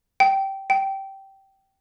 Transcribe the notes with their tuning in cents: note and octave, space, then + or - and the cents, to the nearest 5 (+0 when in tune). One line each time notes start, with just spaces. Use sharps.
G5 -15
G5 -15